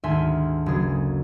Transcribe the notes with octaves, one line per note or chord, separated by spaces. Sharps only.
G#1 D2 E5 G#5 C6
F#1 G#4